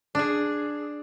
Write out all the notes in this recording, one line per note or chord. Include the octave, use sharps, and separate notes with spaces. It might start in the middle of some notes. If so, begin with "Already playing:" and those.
D4 G#4